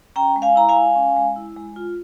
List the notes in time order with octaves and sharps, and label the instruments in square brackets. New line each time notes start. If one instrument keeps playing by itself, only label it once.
[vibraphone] C#4 G5 A#5
G#3
F5 G#5
E4 A#5
F5 G#5
G#3
C#4
G#3
E4
G#3
F4